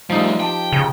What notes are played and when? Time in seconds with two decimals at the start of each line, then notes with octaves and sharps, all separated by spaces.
0.10 F3 G3 A3 D#4
0.40 G4 G5 A5 C6
0.73 C#3